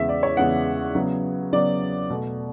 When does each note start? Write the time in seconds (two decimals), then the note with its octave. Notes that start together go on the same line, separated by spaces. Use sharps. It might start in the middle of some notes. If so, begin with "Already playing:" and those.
Already playing: E2 C#3 G#3 B3 E5
0.09 D5
0.23 C#5
0.37 E2 C#3 G#3 B3 F#5
0.95 C#3 F#3 B3
1.53 C#3 F#3 B3 D5
2.10 B2 A3